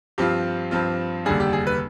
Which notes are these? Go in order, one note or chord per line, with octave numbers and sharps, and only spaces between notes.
G2 F3 C4 F4 G4
G2 F3 C4 F4
F1 D#2 D3 G3 D4 G#4
G4
G#4
B4